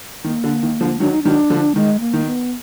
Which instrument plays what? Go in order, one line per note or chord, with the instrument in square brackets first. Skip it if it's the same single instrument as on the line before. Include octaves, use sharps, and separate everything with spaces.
[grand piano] D#3 [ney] A#3
[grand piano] D3
D#3
D3 F3
[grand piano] D#3 F#3 [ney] D4
[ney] D#4
[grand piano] D#3 F#3 [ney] D4
[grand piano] D3 F3
[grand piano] D#3 [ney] G#3
[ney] A#3
[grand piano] D#3
[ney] B3